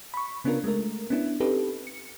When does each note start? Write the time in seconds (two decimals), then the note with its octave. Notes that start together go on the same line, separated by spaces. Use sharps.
0.14 B5 C#6
0.44 C#3 B3 C#4 D4 F4 A#4
0.64 G#3 A3 A#4
1.10 B3 C#4 D4 E4
1.40 C4 D#4 G4 A4 B4
1.87 C#7